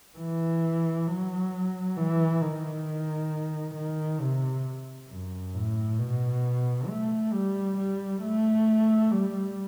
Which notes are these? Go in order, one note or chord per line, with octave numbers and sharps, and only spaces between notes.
E3
F#3
E3
D#3
D#3
C3
F#2
A2
B2
A3
G3
G3
A3
G3